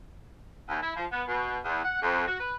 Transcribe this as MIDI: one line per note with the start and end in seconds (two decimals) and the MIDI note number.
0.69 0.80 39
0.82 0.94 64
0.96 1.06 53
1.12 1.25 59
1.28 1.58 47
1.65 1.83 40
1.85 2.00 78
2.02 2.25 41
2.27 2.36 66
2.40 2.55 71